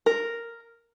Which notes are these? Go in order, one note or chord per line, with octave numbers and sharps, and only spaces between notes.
A#4